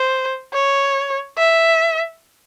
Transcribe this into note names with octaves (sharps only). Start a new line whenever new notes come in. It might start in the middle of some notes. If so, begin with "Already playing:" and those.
Already playing: C5
C#5
E5